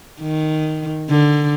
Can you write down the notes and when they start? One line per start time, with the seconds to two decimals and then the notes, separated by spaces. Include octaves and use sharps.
0.21 D#3
1.09 D3